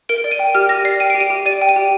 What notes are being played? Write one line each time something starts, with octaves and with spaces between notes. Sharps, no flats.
A#4 D7
D5
D#7
G5
G4 F6
G4 A#6
D5 C7
G5 D#7
G4 D7
D#7
G4
D5 D#7
G5
D#7
G4